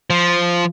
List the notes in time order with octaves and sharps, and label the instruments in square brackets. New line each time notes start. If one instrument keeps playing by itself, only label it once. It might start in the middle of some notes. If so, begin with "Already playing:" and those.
[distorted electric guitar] F3